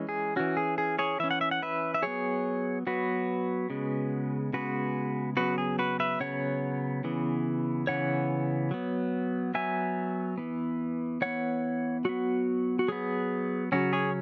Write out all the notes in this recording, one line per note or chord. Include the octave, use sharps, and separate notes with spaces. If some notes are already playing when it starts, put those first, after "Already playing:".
Already playing: E3 G#3 C#4
G#4
E3 C#4 F#4
G#4
G#4
G#4 C#5
E3 C#4 E5
F#5
E5
F#5
B4 E5
E5
F#3 B3 G#4 C#5
F#3 B3 F#4 B4
C#3 G#3 B3
C#3 G#3 B3 F#4 B4
C#3 F#3 B3 F#4 B4
G#4
F#4 B4
B4 E5
C#3 F#3 B3 C#5 F#5
C#3 E3 B3
C#3 E3 B3 C#5 F#5
F#3 B3
F#3 B3 E5 G#5
E3 B3
E3 B3 C#5 F#5
F#3 B3 F#4
F#4
F#3 B3 G#4
C#3 F#3 C#4 F#4
G#4 C#5